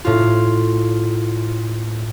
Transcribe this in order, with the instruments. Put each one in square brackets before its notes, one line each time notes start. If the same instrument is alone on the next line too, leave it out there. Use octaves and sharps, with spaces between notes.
[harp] A2 F4